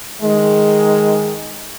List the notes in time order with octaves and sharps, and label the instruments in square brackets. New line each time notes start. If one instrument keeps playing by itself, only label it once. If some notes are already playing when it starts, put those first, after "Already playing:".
[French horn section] D#3 G#3